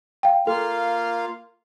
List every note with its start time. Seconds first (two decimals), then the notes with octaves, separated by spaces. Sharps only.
0.23 F5 G5
0.47 A#3 F4 A4 F5